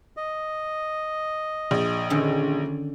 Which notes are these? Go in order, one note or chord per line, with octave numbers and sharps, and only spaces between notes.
D#5
A#1
D3 D#3 C#4